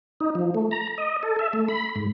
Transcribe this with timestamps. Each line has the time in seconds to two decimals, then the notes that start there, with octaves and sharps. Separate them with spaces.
0.20 D#4
0.35 F3
0.55 A3
0.71 A#5
0.98 D#5
1.23 A4
1.39 E5
1.53 A3
1.69 B5
1.96 G#2